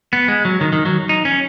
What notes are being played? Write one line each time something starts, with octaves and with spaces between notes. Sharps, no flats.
B3
G#3
F#3
D#3
D#3
F#3
D#4
C#4